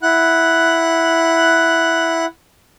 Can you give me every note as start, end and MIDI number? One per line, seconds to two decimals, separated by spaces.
0.03 2.25 64
0.03 2.25 78
0.03 2.25 90